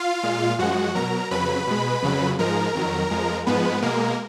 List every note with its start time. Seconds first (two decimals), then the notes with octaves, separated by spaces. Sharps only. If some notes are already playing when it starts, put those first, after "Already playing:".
Already playing: F4 F5
0.23 A#2 G#3
0.59 F#2 F3 G#3 F#4 F#5
0.95 B2 F#3 A#4 A#5
1.31 F2 C#3 F#3 B4 B5
1.67 B2 G#3
2.02 F2 C#3 F#3
2.38 G#2 F3 G#3 A#4 A#5
2.74 F2 D#3 F#3
3.11 F2 F3 G#3
3.46 G#2 F3 G#3 B3 B4
3.82 B2 G#3 A#3 A#4